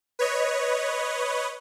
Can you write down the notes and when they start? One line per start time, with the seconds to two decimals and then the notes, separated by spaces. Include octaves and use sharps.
0.19 B4 C#5 D#5